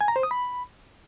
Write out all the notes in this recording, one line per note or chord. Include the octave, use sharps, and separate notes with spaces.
G#5
A#5
C5
D#6
B5